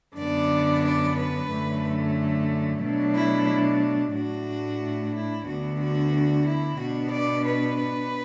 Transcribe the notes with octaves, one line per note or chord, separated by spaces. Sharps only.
F#2 D3 B3 D4 D5
D5
B4
F#2 D3 A3
B2 F#3 A3 D4
E4
A2 A3 D4 F#4
E4
D2 D3 B3 D4 F#4
F#4
E4
B2 B3 D4 F#4
D5
B4
B4